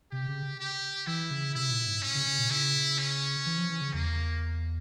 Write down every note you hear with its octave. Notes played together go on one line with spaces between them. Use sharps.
C3 G4
C#3
G4
E3 E4
C#3
C3 E4
A#2
G#2
C#4
C#3
C#3
A#2
C#3 E4
C#4
E3
F3
E3
C#3
E2 A#3